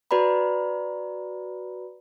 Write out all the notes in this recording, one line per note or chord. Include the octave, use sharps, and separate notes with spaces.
F#4 B4 D5 A#5 B5